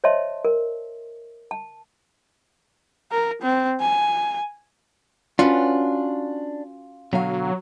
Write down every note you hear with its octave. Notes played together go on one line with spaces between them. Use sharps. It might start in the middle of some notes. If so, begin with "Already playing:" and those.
C5 C#5 D#5 E5 A5 C6
A#4
A5
A#4
C4
G#5
C#4 D4 F4 F#4 B4
B2 D3 F#3 F5